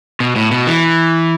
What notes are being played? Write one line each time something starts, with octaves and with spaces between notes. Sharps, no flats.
B2
A2
B2
E3